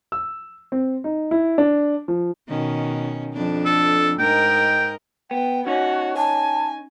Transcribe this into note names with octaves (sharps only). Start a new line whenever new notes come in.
E6
C4
D#4
E4
D4
F3
B2 D#3 C#4
F2 D4
A4
G#2 A#4 D#5 G5
B3 G5
C#4 D#4 F#4 C#5
G#5 A5